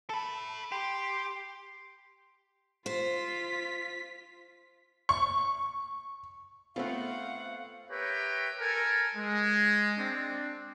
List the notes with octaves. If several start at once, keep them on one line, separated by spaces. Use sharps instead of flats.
A4 B5
G4 C6
F4 C5 B6
C#6
A3 B3 C4 F4 F5 F#5
G4 A#4 B4 C#5 E5 G5
A4 A#4 G#5
G#3
C4 D4